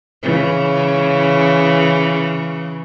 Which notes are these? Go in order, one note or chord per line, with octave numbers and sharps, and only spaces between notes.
C#3 E3